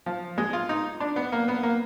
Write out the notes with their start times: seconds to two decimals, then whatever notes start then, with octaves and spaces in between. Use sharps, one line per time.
0.06 F3
0.38 G#3
0.53 F4
0.69 D#4
1.00 D4
1.16 B3
1.32 A#3
1.48 B3
1.63 A#3